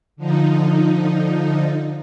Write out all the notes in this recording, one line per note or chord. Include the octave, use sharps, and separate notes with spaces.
D3 F3 D#4